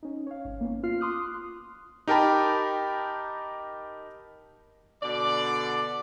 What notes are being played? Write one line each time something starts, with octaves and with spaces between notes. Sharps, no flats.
C#4 D#4
C#5 F5
G#1
A#3 B3 C#4
F4 F6 C7
C6 D6 D#6 F6 F#6
D#4 G4 A#4 G5 A5 B5
B2 D3 D5